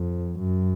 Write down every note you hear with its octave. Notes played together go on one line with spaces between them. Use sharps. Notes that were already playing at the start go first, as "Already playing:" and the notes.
Already playing: F2
F#2